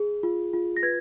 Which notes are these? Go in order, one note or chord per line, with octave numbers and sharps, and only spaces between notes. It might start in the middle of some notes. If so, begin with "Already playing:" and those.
Already playing: G#4
F4
F4
A#6
B4 G#6